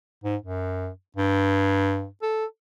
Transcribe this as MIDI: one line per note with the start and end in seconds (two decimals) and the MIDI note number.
0.24 0.36 44
0.42 0.89 42
1.17 2.07 43
2.22 2.45 69